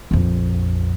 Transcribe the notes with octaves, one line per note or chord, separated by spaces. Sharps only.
A#1 F2